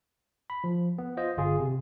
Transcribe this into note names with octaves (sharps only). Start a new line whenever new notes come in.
B5
F3
B3
F4 C5 D#5
G1 F4 G#4
C3